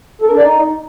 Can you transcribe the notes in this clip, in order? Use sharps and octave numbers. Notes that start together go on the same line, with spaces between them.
A4
A#4
D4
D5
D#4